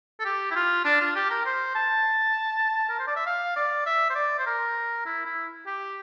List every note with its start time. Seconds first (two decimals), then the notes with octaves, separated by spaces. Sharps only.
0.20 A4
0.25 G4
0.51 E4
0.55 F4
0.85 D4
1.01 F4
1.16 G4
1.30 A#4
1.46 C5
1.75 A5
2.89 A#4
2.99 C5
3.07 D5
3.16 E5
3.26 F5
3.56 D5
3.86 E5
4.10 C5
4.15 D5
4.39 C5
4.47 A#4
5.06 E4
5.25 E4
5.66 G4